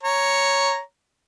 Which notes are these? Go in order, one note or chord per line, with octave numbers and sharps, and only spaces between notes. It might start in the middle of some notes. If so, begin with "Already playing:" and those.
C#5 A#5